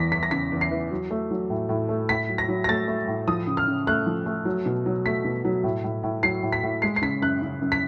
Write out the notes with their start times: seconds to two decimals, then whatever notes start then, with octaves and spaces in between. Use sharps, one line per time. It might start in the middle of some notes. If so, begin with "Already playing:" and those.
Already playing: E2 E3 A#6 B6
0.12 E2 B6
0.23 A#6
0.31 C#3 B6
0.52 E2
0.61 C7
0.71 E3
0.91 F#3
1.11 A3
1.31 F#3
1.50 A2
1.69 A2
1.89 A3
2.09 A2 B6
2.29 F#3
2.38 A#6
2.48 F#3
2.64 A#6
2.68 A3 A6
2.88 A3
3.08 A2
3.28 F3 D#6
3.47 C#3
3.57 F6
3.68 C#3
3.87 A3 F#6
4.06 F3
4.26 A3
4.45 F#3
4.66 B2
4.86 F#3
5.05 A3 B6
5.25 B2
5.45 F#3
5.64 A2
5.84 A2
6.04 A2
6.23 F#3 C7
6.43 A2
6.52 B6
6.63 A2
6.82 G#3 C7
6.96 C7
7.02 C#3 B6
7.22 F#2 F#6
7.42 C#3
7.62 F#2
7.72 B6